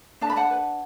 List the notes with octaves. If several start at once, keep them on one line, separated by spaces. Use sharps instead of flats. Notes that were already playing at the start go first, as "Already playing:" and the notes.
D4 A5
B5
F#5 A5
B4